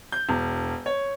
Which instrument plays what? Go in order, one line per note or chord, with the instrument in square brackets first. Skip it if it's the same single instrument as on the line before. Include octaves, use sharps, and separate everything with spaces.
[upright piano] G6
E1
C#5